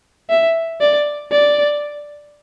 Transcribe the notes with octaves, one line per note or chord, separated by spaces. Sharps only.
E5
D5
D5